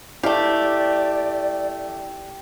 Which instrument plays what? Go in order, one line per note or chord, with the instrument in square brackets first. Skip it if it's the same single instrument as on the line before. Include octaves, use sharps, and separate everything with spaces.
[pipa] A3 F5 [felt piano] E4 [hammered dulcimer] G4 [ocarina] D5